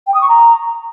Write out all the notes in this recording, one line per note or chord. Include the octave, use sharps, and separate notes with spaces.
G5
D#6
C#6
A#5